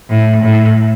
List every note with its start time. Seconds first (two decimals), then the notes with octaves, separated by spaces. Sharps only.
0.10 A2
0.43 A2